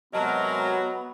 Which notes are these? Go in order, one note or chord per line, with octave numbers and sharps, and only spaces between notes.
C3 F#3 G#3 B3 A#4 D#5 A5 A#5